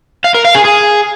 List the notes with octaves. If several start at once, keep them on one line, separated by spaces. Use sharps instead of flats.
F5
A#4
F5
G#4
G#4